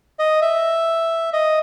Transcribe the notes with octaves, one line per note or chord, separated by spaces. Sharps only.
D#5
E5
D#5